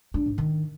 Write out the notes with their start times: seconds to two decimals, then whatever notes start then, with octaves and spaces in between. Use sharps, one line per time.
0.14 D4
0.26 G#2
0.38 D#3